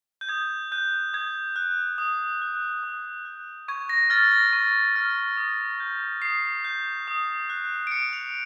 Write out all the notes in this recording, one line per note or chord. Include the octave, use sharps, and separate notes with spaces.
G6
D#6 G#6
F#6 G6
D#6 G#6
F#6
D#6
F#6
D#6
F#6
C#6 G#6
A#6
F6 A6
A#6
C#6
F6
D#6
G6
D#6 C7
G6
D#6
F#6
D7
D#6 C#7
F7